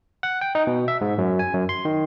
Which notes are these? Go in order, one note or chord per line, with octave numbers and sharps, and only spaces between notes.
F#5
G5
D#4
B2
E5
G#2
F#2
G#5
F#2
C6
D#3